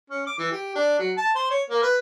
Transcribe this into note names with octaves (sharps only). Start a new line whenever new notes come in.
C#4
D6
E3
G4
D4
F#3
A5
C5
C#5
A#3
B4